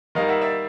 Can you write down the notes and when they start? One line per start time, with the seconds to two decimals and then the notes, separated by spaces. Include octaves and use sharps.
0.15 D#3 G3 A#3 D#5 F5
0.28 E5 F#5
0.41 D5 E5